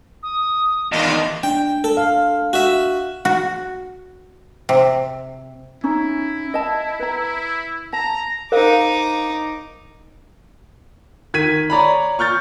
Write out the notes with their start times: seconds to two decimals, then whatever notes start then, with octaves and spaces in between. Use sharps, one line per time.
0.23 D#6
0.92 E2 A#2 D#3 D4 F4 D#5
1.43 D4 G5
1.84 A4
1.97 F5
2.53 F#4 E5
3.25 F#4
4.69 C3
5.84 C#4 D#4 E4
6.54 D#5 A5
6.99 B4 A#5
7.93 A5 A#5
8.52 D#4 A#4 C5 F5 D6
11.34 D#3 G#6 B6 D#7
11.70 C#5 D5 A#5 B5
12.19 C#6 F6 G6 A6